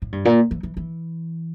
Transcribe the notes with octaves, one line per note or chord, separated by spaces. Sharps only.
A2
G2
A#2
E3
E3
E3